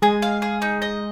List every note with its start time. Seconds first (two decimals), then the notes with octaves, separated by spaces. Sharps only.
0.02 G#3 G#4
0.22 F5
0.42 G#4
0.62 D#4
0.82 D#5